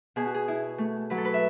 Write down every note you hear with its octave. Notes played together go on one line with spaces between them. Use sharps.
B2 G#4
F#4
G#4
E4
A3
F#3 B4
A4
B4
E5